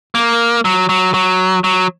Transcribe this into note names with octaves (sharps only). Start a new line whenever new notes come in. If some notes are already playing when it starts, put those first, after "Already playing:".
A#3
F#3
F#3
F#3
F#3